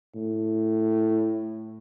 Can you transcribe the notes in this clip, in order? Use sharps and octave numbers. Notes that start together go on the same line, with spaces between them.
A2